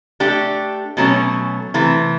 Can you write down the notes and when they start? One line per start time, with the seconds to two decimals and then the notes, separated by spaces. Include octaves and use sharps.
0.20 A3 D4 G4
0.97 B2 F#3 A3 C#4
1.74 C3 E3 A3